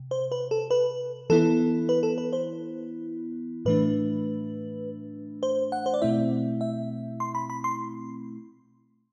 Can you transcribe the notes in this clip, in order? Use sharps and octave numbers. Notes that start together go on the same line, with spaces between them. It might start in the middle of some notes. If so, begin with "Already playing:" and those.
Already playing: C3
C5
B4
A4
B4
E3 B3 E4 A4
B4
A4
B4
C5
A2 E3 A3 D4 B4
C5
F#5
C5
D5
B2 A3 C4 E4 E5
E5
C6
B5
B5
C6